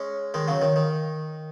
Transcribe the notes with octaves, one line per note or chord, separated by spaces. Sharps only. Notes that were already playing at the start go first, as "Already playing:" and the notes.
Already playing: G#3 C#4
D#3 G#3
C#3 F#3
D#3
D#3